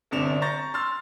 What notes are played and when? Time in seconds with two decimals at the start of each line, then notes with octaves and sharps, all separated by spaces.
0.11 D1 G1 C3 D4 E7 F7
0.42 A#5 C#6 G6 A6 A#6
0.74 C6 E6 F6 A6